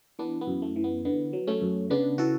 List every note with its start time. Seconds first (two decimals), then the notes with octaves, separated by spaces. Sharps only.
0.19 E3 B3 D4
0.41 B3
0.47 F#2
0.62 A3
0.76 E3
0.84 B3
1.05 D3 B3
1.33 F#3
1.47 A3 C#4
1.62 F#2
1.90 C#3 B3 D4
2.18 E3 F#4 A4